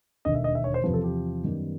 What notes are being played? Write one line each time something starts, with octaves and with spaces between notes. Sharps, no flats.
E1 D#2 D3 D#5
E5
D#5
E5
C#5
C5
E2 C3 F3 B4
A4
G4
F#2 D#3 G3 B3